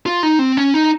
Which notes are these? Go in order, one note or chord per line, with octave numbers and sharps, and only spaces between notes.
F4
D#4
C4
C#4
D#4